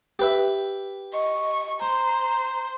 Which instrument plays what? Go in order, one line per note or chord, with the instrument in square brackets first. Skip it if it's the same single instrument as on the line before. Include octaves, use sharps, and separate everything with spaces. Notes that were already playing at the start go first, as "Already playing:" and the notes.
[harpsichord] G4 B4 E5
[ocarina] D#5 [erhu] C#6
[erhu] C5 [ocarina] A#5